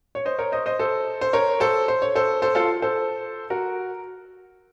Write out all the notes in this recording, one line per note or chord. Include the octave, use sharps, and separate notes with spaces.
C#5
C5 D#5
A#4 C#5
C5 D#5
C5 D#5
A4 C5
C5
A#4 C#5
A4 C5
C5
C#5
A4 C5
A4 C5
F4 A4
A4 C5
F#4 A#4